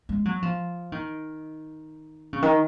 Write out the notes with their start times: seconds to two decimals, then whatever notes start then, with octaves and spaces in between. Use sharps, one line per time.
0.09 G#3
0.25 F#3
0.43 F3
0.92 D#3
2.33 C#3
2.42 D#3